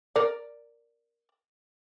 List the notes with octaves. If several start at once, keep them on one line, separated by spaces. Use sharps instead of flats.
A#4 D5